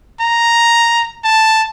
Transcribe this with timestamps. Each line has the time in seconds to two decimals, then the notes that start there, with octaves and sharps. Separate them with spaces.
0.20 A#5
1.24 A5